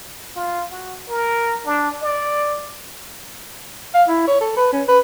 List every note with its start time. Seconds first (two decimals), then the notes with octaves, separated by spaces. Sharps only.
0.36 F4
0.71 F#4
1.09 A#4
1.66 D4
2.03 D5
3.94 F5
4.08 E4
4.27 C#5
4.41 A4
4.57 B4
4.73 C#4
4.88 B4